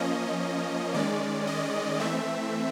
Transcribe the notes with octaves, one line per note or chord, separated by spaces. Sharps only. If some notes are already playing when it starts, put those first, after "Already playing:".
Already playing: F3 A#3 C#4 D#5
D#3 G#3 C#4 D5
D#5
E3 A3 C4 E5